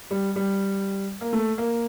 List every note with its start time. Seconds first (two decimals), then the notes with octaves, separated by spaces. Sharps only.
0.11 G3
0.36 G3
1.21 A#3
1.33 A3
1.58 A#3